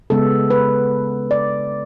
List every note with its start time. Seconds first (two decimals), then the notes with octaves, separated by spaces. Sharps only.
0.10 C#3 G#3 B3 A4
0.50 B4
1.31 D5